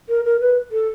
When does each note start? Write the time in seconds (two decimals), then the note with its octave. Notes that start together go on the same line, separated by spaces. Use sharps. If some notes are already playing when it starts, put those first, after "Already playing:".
0.09 A#4
0.25 A#4
0.40 B4
0.71 A4